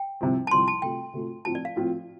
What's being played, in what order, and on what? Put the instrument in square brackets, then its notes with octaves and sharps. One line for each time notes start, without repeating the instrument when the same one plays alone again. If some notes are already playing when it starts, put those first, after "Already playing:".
Already playing: [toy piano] G5
[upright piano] C2 C3 F3 C4
[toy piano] A5
[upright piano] C2 C3 F3 C4 [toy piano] C6
[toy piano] A5
[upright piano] C3 A3 F4 [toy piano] G5
[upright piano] C3 A3 F4
[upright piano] A2 F3 C4 F4 [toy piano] A5
[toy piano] D5
F5
[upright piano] A2 F3 C4 F4